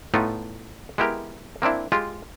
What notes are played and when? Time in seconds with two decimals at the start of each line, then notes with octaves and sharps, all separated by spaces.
0.14 A2 A3 B3 D#4 F4
0.98 G#3 B3 E4 G4 A#4
1.62 A#3 C4 D4 E4
1.92 G#3 F4 G4